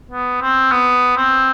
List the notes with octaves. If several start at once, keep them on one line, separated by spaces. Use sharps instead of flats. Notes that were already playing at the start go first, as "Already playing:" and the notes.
B3
C4
B3
C4